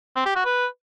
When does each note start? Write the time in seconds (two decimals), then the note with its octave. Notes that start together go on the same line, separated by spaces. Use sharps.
0.16 C4
0.26 G4
0.36 F#4
0.45 B4